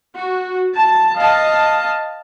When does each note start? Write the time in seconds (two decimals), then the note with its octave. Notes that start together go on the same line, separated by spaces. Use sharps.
0.17 F#4
0.74 A5
1.17 D#5 F5 A5